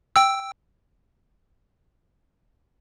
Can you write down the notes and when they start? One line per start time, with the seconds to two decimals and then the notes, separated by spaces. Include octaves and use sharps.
0.16 G5 E6